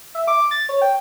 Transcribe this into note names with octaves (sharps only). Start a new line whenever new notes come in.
E5
D6
A6
C#5
G5